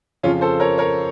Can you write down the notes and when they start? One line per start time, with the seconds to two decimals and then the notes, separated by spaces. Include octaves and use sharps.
0.23 F2 C#3 F3 C#4 F4
0.41 A4 C5
0.60 A#4 C#5
0.78 A#4 C#5